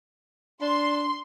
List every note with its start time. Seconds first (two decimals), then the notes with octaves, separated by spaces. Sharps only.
0.61 D4 C6